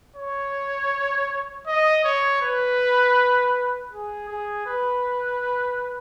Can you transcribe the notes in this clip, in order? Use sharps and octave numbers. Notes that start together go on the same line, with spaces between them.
C#5
D#5
C#5
B4
G#4
G#4
B4